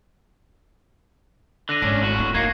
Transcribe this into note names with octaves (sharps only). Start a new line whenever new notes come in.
D3 F#6 A#6 D#7
G#1 C#4 D4
A2 F#4
D4
A#3 D#4 E4 G#6 C7 C#7